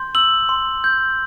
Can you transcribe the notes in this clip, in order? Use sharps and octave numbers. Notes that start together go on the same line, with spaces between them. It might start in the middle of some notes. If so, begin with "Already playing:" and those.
Already playing: C6 G6
E6 F#7
C6
G6